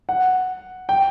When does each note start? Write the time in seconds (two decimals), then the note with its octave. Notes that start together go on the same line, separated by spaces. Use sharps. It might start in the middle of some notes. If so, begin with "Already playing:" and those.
0.09 F#5
0.89 G5